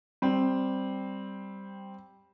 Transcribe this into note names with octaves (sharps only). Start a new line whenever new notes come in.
G3 C4